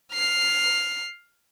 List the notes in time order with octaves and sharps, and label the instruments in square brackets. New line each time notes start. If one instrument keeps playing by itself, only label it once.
[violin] F6 C7